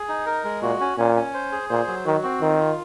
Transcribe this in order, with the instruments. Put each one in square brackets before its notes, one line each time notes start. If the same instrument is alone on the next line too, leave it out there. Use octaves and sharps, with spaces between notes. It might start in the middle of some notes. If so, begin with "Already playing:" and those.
Already playing: [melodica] G#4
D#4
A#4
G#3
[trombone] A#2 [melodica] F#4
[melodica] C#4
[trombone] A#2 [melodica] C#4
[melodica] C#4
C5
G#4
[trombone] A#2 [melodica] C5
[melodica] F#3
[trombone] D#3 [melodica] F#4
[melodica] C4
[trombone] D#3 [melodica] F4
[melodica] F4